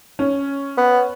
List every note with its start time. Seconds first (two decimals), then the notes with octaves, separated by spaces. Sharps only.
0.19 C#4
0.77 B3